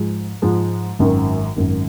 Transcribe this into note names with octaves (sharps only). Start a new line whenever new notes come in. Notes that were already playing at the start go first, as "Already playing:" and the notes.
Already playing: G#2 F3 G#3
G#2 F3 G#3
G#1 F#2 D#3
G#1 F#2 D#3